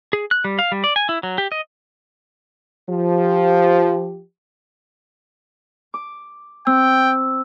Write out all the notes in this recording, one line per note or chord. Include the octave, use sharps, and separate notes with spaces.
G#4
F#6
G3
F5
G3
D5
G#5
E4
F#3
G4
D#5
F3 G4
D6
C4 G5 E6